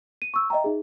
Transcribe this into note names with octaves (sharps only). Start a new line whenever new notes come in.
D#7
C#6 E6
D#5 E5 G5 A#5
D#4 G#4